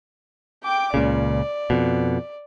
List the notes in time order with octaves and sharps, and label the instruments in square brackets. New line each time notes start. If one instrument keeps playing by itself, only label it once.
[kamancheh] G5 D6
[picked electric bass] C#2 A#2 C#3 [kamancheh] D5
[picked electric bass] F2 B2